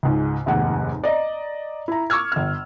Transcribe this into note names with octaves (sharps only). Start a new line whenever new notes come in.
C#2 G#2
F1 D#2 G#2 F#5
D5 D#5 A#5
E4 A#5
C#6 D6 E6 F6 G#6
G1 F6